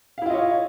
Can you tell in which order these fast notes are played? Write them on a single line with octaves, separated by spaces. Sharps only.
F5 E4 F4 D#5 C#5